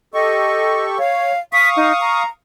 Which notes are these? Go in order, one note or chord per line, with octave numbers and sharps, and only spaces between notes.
G4 A4 D#5 C#6
C#5 F5
F5 C#6 D#6 B6
D#4
A#5